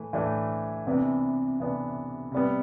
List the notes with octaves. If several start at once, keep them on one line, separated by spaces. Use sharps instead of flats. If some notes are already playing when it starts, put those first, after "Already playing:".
Already playing: A2 E3 A3
A2 E3 A3 D4
C3 E3 B3 D4
C3 E3 B3 D4
C3 G3 B3